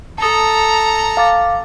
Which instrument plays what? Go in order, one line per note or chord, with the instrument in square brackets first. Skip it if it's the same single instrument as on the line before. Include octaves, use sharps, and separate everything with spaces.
[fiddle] A4 A#5 [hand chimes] A5 D#6
[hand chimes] F5 D6 A6